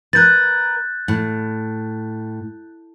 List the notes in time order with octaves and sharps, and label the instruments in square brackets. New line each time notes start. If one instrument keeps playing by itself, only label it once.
[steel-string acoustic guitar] A#4 B4 [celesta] F#6 G6 A6
[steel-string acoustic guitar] A2